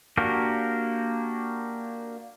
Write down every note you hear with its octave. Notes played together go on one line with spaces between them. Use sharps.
A#3 D4 F#4 G4 A#4